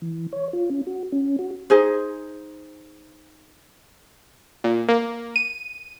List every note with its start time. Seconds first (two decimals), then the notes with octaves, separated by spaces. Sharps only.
0.02 E3
0.33 C#5
0.53 F4
0.70 C#4
0.87 F#4
1.12 C#4
1.39 F#4
1.70 D#4 G#4 C5
4.64 A#2
4.89 A#3
5.36 D#7